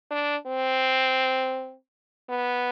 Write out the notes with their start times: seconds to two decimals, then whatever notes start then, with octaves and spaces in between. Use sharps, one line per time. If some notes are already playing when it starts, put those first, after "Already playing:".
0.11 D4
0.46 C4
2.29 B3